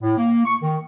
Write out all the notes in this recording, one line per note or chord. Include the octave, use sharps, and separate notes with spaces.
A2
A#3
C#6
D#3